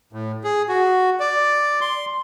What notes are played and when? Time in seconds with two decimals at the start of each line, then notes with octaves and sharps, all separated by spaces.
0.13 A2
0.44 G#4
0.69 F#4
1.20 D5
1.81 C6